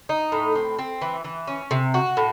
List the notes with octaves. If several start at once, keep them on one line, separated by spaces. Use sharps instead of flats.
D#4
A2
C4
C4
E3
E3
C#4
C3
F#4
A2